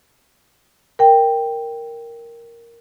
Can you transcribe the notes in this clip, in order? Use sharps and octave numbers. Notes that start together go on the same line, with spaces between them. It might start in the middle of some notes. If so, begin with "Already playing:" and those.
A#4 G5